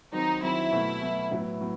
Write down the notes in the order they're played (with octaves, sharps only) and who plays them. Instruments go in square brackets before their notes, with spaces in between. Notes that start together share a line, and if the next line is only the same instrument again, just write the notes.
[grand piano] D#3 F#3 C4 [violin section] D#4
[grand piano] D#3 F#3 C4 [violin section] E4
[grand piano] B2 F#3 A3
B2 F#3 A3
A2 F#3 B3 E4
A2 F#3 B3